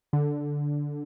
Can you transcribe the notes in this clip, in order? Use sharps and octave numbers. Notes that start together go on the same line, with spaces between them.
D3